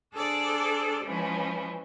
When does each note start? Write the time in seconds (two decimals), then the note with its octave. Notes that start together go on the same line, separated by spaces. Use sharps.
0.14 D4 G#4 A4 C5 D5
1.04 E3 F3 G#3 C#4